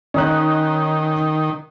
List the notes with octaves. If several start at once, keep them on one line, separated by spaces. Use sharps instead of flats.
D#3 C#4 D#4 F#6